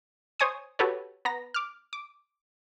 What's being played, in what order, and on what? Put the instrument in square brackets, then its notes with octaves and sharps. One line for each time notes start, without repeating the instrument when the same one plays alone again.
[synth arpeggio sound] C5 C#5 G#5 C#6 D#6
F#4 G4 A4 B4 C#5
B3 A#5 A#6
D6 F6
D6